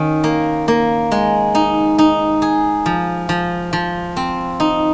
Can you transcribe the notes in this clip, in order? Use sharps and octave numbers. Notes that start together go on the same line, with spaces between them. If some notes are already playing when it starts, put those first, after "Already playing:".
Already playing: D#3 C#4
A#3
A#3
G#3
D#4
D#4
G#4
F3
F3
F3
C4
D#4